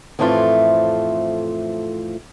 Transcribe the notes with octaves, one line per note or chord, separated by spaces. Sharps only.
F2 A2 E3 A3 C4 F4